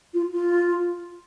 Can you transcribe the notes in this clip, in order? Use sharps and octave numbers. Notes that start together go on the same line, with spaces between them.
F4
F4